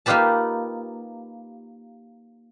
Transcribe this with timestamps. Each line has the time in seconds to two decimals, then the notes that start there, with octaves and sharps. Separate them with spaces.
0.06 A#3 D#4 F4 G4 B4 A5